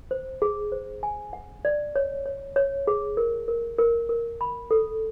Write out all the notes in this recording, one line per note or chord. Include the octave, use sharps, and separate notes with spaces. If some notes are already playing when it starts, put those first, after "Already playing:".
C5
G#4
C5
G#5
F#5
D5
C#5
C#5
C#5
G#4
A#4
A#4
A#4
A#4
B5
A4